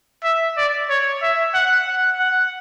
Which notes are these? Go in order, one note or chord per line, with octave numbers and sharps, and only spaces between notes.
E5
D5
C#5
E5
F#5
F#5
F#5